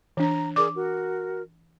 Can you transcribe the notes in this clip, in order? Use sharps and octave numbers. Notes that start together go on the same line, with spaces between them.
E3 D4 A#5
G#4 A#4 D5 D6
F#4 A#4